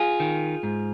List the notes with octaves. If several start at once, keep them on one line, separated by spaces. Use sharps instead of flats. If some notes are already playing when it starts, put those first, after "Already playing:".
Already playing: F4 G#4
D#3
G#2